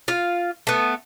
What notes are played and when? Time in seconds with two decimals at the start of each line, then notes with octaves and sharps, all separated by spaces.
0.08 F4 F5
0.67 A3 B3